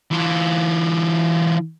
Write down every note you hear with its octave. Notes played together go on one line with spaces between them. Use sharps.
E3 F4